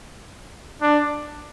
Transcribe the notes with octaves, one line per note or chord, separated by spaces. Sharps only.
D4